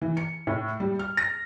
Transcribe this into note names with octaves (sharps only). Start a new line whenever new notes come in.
E3
C#7
A2
G3
F6
A#6